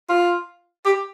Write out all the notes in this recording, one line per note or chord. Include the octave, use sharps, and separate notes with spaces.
F4
G4